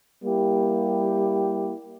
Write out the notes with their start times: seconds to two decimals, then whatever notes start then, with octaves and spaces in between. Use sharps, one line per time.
0.23 G3 A#3 E4 G4